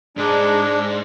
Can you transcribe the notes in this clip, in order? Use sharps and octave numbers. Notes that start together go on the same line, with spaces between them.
G#2 G#3 D4